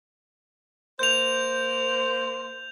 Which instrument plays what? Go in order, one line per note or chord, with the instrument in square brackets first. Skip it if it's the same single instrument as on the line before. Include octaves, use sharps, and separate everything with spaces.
[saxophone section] A#3 C5 [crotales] G6 F7